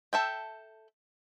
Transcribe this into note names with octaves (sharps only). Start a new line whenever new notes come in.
A4 E5 G5